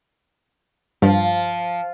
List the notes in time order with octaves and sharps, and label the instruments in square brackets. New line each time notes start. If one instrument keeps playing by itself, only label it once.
[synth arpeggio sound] G2 [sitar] F3